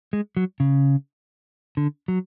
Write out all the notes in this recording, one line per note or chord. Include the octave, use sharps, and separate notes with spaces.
G#3
F#3
C#3
D3
F#3